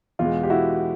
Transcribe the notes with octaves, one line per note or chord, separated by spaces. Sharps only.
E2 B2 G#3 F4
G4
E4 F#4